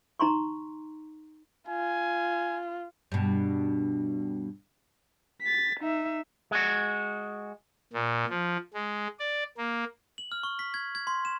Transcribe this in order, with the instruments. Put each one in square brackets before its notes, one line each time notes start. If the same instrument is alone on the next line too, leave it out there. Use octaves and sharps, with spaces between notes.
[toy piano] D#4 A#5 C6 C#6
[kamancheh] F4 [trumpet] G#5
[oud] G2 B2
[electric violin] A6 B6
D#4 E5
[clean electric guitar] G#3 F#4
[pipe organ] A#2
F3
G#3
D5
A#3
[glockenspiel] F#7
F6
C#6
B6
G#6
G#6
C6
E7